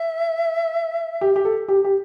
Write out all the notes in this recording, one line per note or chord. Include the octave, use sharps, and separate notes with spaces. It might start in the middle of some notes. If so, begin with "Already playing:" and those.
Already playing: E5
G4
G4
A4
G4
G4